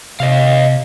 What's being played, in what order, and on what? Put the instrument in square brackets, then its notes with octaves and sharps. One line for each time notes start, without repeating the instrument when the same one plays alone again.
[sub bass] C3 [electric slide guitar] D#5 F5